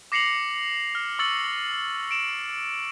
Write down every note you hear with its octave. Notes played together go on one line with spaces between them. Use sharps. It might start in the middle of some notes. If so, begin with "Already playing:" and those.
D6 A#6 C7 C#7 F7 F#7
F6
C#6 E6 A6 C#7 F#7
D7 E7